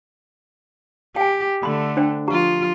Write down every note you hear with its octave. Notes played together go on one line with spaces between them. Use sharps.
G4 G5 G#5
D3 A3 B5 C6
D4 C5 G5
F3 F4 G4 A#5